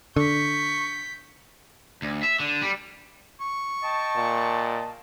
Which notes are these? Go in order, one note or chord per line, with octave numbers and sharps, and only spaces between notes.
D3 C#6 G6 B6
D2
E5
D3
G3
C#6
D#5 G5 A5
A#2